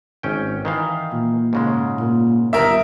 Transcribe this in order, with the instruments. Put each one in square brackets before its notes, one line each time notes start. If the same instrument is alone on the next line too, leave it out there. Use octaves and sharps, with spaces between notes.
[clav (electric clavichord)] G#1 C#4 G5
D#3 E3 F5
[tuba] A#2
[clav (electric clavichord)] G#2 C#3 G#3
[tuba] A#2
[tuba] G1 [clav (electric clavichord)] D#3 [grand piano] A#4 E5